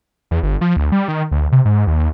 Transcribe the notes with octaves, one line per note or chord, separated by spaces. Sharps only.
E2
G1
F3
D2
G3
D#3
D2
C3
G#2
D#2